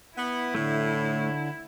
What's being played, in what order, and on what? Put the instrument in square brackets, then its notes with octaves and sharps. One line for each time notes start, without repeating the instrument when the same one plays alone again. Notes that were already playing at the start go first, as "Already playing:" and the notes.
[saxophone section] B3 [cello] E4
[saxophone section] A2 [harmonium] D3 [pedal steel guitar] A3